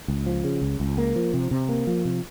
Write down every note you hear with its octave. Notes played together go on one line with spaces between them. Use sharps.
C#2
F3
C#3
C#2
C#2
A#3
F3
C3
C3
A#3
F3
C3